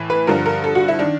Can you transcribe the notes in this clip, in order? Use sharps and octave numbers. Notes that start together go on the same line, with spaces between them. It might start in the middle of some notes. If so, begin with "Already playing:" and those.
Already playing: A2 E3
B4
G2 D3 F3 A#4
A#4
A4
F#4
E4
D#3 D4